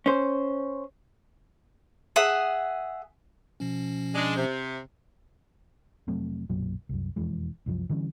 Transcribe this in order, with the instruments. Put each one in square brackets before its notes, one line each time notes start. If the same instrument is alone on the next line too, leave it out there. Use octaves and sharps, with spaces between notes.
[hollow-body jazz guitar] C#4 C5
[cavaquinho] G#4 E5 F#5 D#6
[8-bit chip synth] B2 F3 C#4
[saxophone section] G#3 D4
C3
[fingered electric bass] F1 F#3 A3 C4
B1 F#2 A#2 F#3
C2 F#2
E1 F2 E3 G#3
C2 F#2 F3
D3 E3 G3 C#4